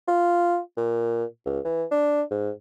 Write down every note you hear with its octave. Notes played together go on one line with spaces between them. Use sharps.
F4
A#2
C#2
E3
D4
G#2